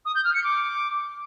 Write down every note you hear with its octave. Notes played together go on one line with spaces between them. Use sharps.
D#6
G6
F6
C#7
D6